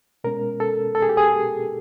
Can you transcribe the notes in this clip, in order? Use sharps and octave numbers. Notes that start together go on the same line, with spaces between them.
B2 G#3 C#4 A#4
A4
A4
G#4
G4
G#4